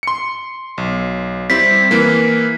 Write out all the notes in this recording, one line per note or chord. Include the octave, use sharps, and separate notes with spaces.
C6 C#7
B1
G3 C4 E4 B6
E3 A#3